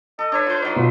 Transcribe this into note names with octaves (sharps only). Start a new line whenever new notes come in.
A4 D#5
D4 B4 C#5
F4 B4
F#3 D#4 D5
B2 F4